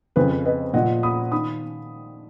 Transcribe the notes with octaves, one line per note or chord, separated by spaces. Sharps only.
F2 C#3 F3 B4
B4 D#5
A#2 F3 D#5 F#5
B5 D#6
D#3 B5 D#6